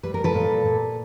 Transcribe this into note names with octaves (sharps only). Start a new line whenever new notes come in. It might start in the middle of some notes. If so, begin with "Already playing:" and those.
G3 B4
A#4
A4 B4
A#2
A#2